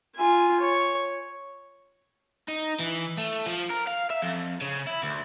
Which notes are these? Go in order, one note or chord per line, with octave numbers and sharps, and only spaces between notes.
F4 G#5
C#5
D#4
E3
A3
F3
A#4
F5
E5
F2
C#3
E4
D2